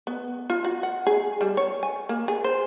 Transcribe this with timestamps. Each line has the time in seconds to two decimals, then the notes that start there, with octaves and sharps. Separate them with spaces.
0.07 B3
0.50 F4
0.65 F#4
0.83 F#5
1.07 G#4
1.41 G3
1.57 C#5
1.83 G#5
2.09 A#3
2.28 G#4
2.44 C5